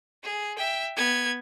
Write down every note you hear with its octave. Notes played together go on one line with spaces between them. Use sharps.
G#4
E5 G5
B3 G#6